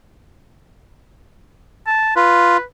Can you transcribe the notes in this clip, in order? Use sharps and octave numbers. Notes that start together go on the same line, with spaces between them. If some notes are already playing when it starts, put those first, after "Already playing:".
A5
F4 B4